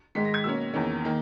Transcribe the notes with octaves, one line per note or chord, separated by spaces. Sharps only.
G#2 D#3 G#3 B6
A#6
G#6
B2 A#3 C#4 E6
E2 D#3 A#3 C#4
D#3 A#3